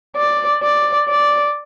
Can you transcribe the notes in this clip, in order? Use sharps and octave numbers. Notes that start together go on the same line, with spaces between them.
D5
D5
D5